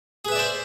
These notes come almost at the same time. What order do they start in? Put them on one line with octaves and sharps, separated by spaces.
G#4 B4 E5 D5 C5